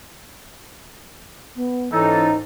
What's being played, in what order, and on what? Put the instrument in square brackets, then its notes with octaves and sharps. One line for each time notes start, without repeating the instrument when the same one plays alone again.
[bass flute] B3
[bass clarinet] G#2 [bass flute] E3 [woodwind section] C#4 A4 [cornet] D#4